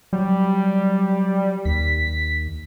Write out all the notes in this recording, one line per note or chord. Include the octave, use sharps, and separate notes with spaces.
F#3 G3
D#2 B6